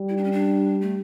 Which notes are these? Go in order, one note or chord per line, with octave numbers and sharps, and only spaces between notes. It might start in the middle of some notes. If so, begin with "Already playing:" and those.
Already playing: G3
E4
D4
C#4
D4
A3